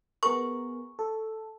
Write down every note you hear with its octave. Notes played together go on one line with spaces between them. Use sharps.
B3 G#4 A#4 C#6
A4